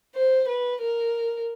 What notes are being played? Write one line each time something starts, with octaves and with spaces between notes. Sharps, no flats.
C5
B4
A#4